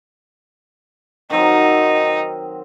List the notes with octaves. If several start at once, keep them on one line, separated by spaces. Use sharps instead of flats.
D#3 F#3 C4 D#4